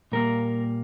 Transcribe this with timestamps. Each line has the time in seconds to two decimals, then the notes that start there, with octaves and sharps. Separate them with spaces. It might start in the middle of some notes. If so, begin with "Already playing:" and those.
0.12 A#2 G3 A#3 A#4